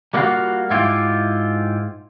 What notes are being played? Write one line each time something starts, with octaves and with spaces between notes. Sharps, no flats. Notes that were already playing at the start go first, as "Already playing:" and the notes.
G3 A#3 D#4 F4 F#4 F5
G#2 E4 F4 G4